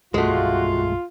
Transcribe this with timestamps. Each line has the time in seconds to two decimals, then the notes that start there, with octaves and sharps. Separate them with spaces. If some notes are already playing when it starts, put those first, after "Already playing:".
0.14 C2 G2 B2 G#3 A3 F4 F#4